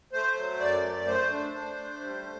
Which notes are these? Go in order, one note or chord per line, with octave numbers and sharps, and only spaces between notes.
A3 C5
F#3
F#2 D5
A3
A3 C5
D4
D4
A3
G3